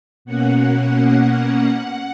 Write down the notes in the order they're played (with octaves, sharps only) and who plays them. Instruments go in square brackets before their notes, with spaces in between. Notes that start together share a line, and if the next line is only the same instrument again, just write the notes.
[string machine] B2 A#3 C#4 F#5